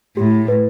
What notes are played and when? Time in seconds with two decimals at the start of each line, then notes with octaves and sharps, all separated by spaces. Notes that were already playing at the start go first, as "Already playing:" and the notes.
0.17 A2 G4
0.48 B4